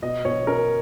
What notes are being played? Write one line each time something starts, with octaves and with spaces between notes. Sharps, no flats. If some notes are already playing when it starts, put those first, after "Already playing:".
B2 D#5
B2 C#5
C#4 A#4